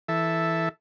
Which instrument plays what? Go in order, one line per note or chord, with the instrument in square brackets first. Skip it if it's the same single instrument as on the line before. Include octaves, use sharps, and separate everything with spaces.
[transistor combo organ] E3 A4 E5